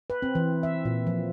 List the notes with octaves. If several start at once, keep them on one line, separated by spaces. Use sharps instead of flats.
B4
C4
E3
E5
A#2
F3